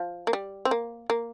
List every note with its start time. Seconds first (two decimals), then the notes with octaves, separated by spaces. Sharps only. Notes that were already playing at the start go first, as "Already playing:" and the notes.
Already playing: F3
0.27 A#3
0.33 G3
0.65 C4
0.71 A#3
1.10 A#3